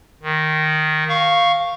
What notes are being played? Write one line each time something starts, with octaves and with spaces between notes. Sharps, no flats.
D#3
F5 C#6